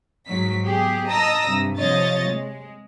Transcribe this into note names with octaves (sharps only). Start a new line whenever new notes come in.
G#2 F#3 B6
B3 G4 G#4
D#5 A5 A#5 D#6 E6 A#6
G2 C3
C3 F3 C#5 D#5 A6
G#3